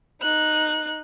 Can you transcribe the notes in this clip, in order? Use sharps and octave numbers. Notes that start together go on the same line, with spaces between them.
D#4 F#6